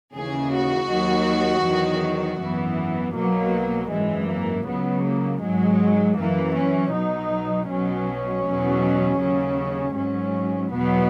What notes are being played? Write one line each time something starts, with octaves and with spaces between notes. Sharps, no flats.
D#2 C#3 E3 G#4
F#4
D#2 D#3 F#3
E2 D#3 F#3
G#1 F#2 E3 B3
B1 B2 F#3 A#3
G#1 F#2 E3 G#3
A#3
C#2 C#3 F#3 B3
A#3
G#1 G#2 F#3 G#3
F#2 E3 A#3
C#4
B1 B2 F#3 D#4
B1 B2 F#3 C#4
E2 B2 F#3
D#2 C#3 F#3
G#1 G#2 F#3 C#4
E2 B2 F#3 B3